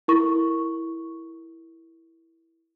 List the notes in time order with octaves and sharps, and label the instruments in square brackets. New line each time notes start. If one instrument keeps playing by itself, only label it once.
[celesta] E4 A4 A#4 C#6